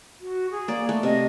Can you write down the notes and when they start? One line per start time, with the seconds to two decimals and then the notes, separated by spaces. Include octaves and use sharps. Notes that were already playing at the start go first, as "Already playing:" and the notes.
0.20 F#4
0.50 G#4
0.68 A#3 D5
0.89 A3
1.03 C3 D#5